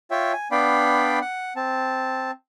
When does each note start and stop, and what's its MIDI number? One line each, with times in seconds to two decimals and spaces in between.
0.11 0.32 65
0.11 0.32 73
0.11 0.32 76
0.11 0.32 79
0.33 0.48 80
0.51 1.19 59
0.51 1.19 62
0.51 1.19 74
0.51 1.19 77
0.51 1.19 79
0.51 1.19 83
1.21 1.53 78
1.56 2.31 60
1.56 2.31 81